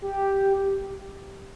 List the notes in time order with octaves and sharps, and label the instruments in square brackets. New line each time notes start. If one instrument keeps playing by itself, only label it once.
[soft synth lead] G4